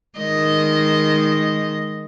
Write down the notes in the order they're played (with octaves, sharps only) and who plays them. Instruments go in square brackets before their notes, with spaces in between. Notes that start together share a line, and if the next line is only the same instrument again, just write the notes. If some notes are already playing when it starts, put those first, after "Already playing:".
[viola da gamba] D#3 G#3 D#5